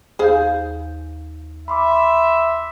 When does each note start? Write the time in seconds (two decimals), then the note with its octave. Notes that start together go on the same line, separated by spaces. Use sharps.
0.19 D#2 G#4 C5 F5 G6
1.68 E5 B5 C6 D6